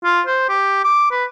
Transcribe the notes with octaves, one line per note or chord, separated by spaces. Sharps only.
F4
C5
G4
D6
B4